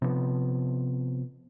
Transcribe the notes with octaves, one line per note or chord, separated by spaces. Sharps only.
C3 F3 B3